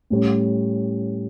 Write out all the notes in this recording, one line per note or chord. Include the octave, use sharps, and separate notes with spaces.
A2 G3 C#4